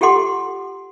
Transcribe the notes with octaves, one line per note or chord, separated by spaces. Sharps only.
F4 G4 A4 F#5 C6 D6